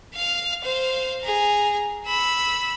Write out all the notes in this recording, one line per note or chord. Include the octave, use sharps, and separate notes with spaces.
F5 F6
C5 F5
G#4 A#5
B5 E6